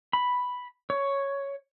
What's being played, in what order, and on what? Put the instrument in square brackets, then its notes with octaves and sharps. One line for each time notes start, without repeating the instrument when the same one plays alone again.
[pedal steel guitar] B5
C#5